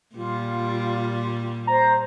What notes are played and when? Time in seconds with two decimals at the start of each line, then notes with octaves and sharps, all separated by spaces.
0.16 A#2 G3 F4
1.67 C5 A#5